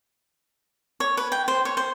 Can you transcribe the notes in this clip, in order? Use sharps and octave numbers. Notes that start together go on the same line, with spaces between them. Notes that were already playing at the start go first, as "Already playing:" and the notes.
C#5
B4
G5
C5
C#5
C5